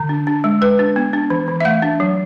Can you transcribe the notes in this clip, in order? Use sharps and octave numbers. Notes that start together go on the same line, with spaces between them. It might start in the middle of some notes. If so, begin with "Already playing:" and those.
Already playing: D3
D4
D4
G#3
G#3 B4
D4
B3
D4
E3
E3
E5
A3 F#5
D4
F#3